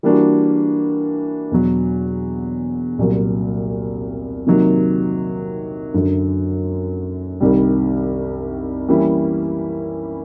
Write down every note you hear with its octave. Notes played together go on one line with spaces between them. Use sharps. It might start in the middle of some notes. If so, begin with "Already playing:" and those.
E3 G3 A#3 D4 F#4
E2 B2 F#3
C2 A#2 F#3
C3 D#3 F#3 A#3
F#2 D3 F#3
C2 C3 D#3 G3
E3 G3 A#3 C#4 E4